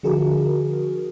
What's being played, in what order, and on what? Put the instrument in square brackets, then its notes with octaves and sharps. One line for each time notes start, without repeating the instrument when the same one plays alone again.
[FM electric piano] D3 F3 F#4 G#4 A#4